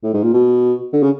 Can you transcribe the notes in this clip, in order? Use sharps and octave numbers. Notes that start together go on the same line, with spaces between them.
A2
G#2
A#2
B2
D3
C#3